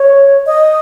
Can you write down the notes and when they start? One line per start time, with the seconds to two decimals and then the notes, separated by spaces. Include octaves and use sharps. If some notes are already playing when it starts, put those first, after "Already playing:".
Already playing: C#5
0.46 D#5